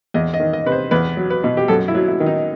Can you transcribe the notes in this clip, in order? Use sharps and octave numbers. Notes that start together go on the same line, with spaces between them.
E2 D#5
D#5
D#3
D#5
C3 B4
C5
E2 B4
F#3
B4
B2
G4
F#2 A4
E4
F#3
E4
D#3
D#4